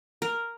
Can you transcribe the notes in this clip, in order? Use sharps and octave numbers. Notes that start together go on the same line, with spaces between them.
A#4